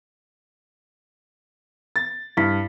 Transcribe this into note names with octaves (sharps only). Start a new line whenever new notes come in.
A6
G2 E4 B6